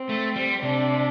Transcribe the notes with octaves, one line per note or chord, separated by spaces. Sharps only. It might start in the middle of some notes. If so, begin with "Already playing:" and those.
Already playing: C4
A3
G3
C3 D4